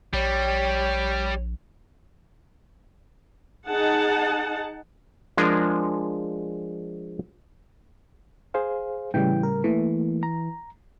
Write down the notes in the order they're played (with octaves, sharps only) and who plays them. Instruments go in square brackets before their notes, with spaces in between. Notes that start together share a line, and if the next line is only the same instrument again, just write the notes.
[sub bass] A#1 [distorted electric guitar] G3 [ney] C#5
[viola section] D#4 G#4 F#5 A5
[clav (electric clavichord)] F3 G#3 D4 G#4 A#4
[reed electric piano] G#4 C5 F5
[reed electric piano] A2 C#3 G3 [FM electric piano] E3 G5
[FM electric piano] A#4
[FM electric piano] E3 [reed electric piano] A3 A#3
[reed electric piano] A#5